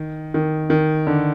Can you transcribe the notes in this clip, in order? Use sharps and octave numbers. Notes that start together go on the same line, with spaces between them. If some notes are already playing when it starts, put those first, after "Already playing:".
Already playing: D#3
D#3
D#3
D3